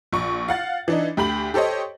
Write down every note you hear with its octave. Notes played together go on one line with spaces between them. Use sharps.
A#1 C#6
F5 F#5 A6
E3 D4 D#4
D2 G4 B5 F#7
G4 A4 C5 C#5 D#5